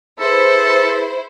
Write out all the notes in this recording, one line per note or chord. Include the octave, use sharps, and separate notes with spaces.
E4 G#4 A4 B4 C5